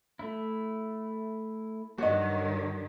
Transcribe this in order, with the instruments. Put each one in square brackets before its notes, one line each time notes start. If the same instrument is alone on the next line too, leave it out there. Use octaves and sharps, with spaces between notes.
[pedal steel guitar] A3 E4
[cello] G2 D#3 [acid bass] F#3 [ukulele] F#4 D#5